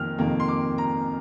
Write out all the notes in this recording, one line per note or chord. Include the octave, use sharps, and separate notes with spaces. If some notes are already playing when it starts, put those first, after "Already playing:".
Already playing: F2 C3 D#3 A#3 F6
F2 C3 D#3 A#3
C6
D6
A#5